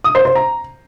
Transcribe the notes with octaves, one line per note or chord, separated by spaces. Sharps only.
D#6
C5
C5
A#5